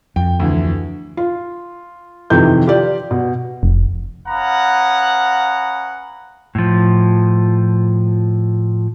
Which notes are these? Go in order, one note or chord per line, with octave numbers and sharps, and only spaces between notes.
F2 G5
D2 E3
F4
F2 C3 D#3 E3 G6
F4 G4 D5
B2
F1
C#4 B4 D#5 F5 F#5 A#5
A2 F3